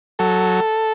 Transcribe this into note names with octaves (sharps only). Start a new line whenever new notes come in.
F#3 A4